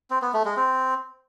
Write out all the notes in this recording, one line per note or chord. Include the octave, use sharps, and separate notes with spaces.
C4
B3
A3
G#3
C4